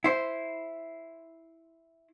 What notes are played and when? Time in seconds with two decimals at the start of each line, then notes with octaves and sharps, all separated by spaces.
0.04 E4 C5